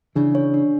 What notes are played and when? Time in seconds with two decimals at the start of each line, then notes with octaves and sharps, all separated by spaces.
0.15 C#3 E3 D4
0.35 C#5
0.54 D4